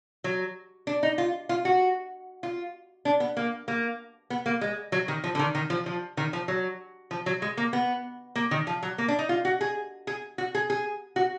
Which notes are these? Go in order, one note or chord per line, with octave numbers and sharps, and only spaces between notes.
F#3
D4
D#4
F4
F4
F#4
F4
D4
B3
A#3
A#3
B3
A#3
G#3
F#3
D#3
F3
D3
D#3
D#3
F3
F3
D#3
F3
F#3
F3
F#3
G#3
A#3
B3
A#3
D#3
F3
F#3
A#3
D4
D#4
F4
F#4
G#4
G#4
F#4
G#4
G#4
F#4